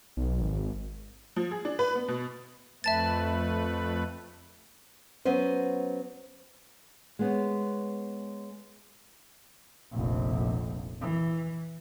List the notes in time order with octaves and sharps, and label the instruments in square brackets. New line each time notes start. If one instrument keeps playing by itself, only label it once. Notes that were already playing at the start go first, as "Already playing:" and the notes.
[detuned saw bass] B1
G#1
[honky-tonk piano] F3
G#4
D4
B4
B3
B2
[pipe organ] F2 A3 B4 [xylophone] E5 A5 A6
[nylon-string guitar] F#3 B3 C#4 C5
G#3 B3 C#4
[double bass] F1 A#1
E3